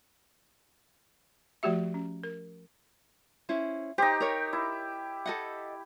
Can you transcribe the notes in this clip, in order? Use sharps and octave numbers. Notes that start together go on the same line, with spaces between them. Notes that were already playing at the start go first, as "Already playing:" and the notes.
F3 A3 F#4 G4 E5
C#4
A#4
C#4 E4 C5
D#4 G4 C5
A#4 C#5
E4
A4 D#5 F#5